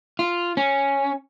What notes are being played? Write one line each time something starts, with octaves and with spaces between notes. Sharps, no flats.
F4
C#4